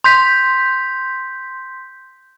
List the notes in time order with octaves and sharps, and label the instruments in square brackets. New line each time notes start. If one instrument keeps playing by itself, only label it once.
[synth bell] C6 G6 B6